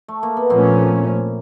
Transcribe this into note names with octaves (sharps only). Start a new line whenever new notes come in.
A3
A#3
B3
A#2 F3 A3 A#3 C4 C#4